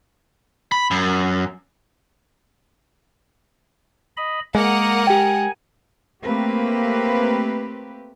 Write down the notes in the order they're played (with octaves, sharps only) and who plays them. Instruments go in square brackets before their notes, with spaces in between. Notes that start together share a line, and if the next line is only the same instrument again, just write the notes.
[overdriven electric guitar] B5
F#2
[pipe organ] D#5 B5
[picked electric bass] G#3 [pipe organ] A#3 [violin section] A#4 F#5 D#6
[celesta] G4 G5 [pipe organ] G#5
[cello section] A3 A#3 C4 G4 B4